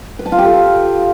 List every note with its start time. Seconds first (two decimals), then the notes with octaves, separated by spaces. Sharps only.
0.19 B4
0.26 A5
0.32 F4
0.38 G4
0.45 A4